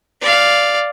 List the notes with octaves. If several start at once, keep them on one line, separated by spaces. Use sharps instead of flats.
D5 F5